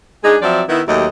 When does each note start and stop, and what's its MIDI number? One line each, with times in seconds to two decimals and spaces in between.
0.24 0.36 56
0.24 0.36 62
0.24 0.36 63
0.24 0.36 68
0.42 0.63 53
0.42 0.63 54
0.42 0.63 60
0.42 0.63 74
0.42 0.63 76
0.69 0.82 51
0.69 0.82 59
0.69 0.82 64
0.88 1.07 39
0.88 1.07 54
0.88 1.07 57
0.88 1.07 67
0.88 1.07 75